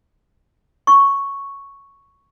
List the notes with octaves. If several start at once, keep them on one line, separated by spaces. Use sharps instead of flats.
C#6